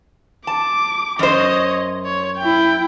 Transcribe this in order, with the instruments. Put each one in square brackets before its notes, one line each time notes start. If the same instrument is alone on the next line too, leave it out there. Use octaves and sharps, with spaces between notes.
[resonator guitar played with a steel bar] A5 [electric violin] D6
[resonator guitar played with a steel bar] F#2 C5 [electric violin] C#5 D#5
[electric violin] C#5
E4 G5